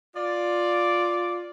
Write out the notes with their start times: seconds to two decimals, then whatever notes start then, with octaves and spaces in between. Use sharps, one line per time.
0.16 F4 D5